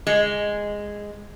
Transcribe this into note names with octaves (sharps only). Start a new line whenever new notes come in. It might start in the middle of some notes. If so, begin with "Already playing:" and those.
G#3